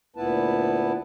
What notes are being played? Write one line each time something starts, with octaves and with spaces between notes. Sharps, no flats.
D2 A#2 B3 E4 B4 A5